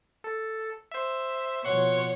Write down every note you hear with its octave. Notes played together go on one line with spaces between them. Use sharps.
A4
C5 E5
B2 F3 C#5 F#5 C6 C#6